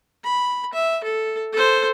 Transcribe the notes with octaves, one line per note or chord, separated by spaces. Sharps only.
B5
E5
A4
A4 C5